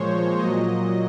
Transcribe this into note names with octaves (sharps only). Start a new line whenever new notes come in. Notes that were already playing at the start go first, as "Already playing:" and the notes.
Already playing: A#2 F3 G#3 C5 C#5
A#2 F#3 D#5